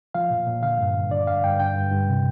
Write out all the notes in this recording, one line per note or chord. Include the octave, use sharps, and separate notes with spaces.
F3 F5
A#2
A#2
D3 F5
G2
G2
D3 D5
G2 F5
G2 G5
D3 G5
G2
G2
C3